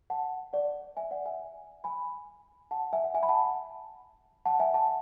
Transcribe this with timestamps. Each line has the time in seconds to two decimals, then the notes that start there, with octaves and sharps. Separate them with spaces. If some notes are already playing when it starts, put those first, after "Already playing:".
0.10 F#5 A5
0.53 D5 F#5
0.97 E5 G#5
1.11 D5 F#5
1.26 E5 G#5
1.84 G#5 B5
2.71 F#5 A5
2.93 E5 G#5
3.04 F#5
3.14 E5 G#5
3.23 B5
3.29 F#5 A5
4.46 F#5 A5
4.60 E5 G#5
4.74 F#5 A5